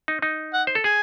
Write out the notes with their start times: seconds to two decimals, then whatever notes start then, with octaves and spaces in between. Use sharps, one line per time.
0.08 D#4
0.22 D#4
0.54 F#5
0.67 C5
0.75 A4
0.84 G#4 G#5